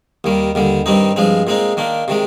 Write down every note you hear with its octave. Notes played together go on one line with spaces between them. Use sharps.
D#2 D#3 G3
D#2 D3 G3
G2 D#3 G3 C4 D#4
G2 F3 G#3 C4
A#2 G#3 C4 D#4
D#3 A#3 D4
C3 D#3 G#3